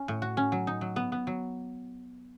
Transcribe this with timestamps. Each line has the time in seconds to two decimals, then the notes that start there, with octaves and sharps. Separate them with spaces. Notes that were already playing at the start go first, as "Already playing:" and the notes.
Already playing: C#4
0.08 A2
0.22 F#4
0.37 C#4
0.52 F#3
0.67 D#4
0.81 F#3
0.96 B3
1.12 B3
1.27 F#3